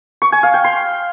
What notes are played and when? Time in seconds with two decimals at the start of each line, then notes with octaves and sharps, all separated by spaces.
0.22 C#6
0.32 G#5
0.43 F5
0.54 G5
0.64 C6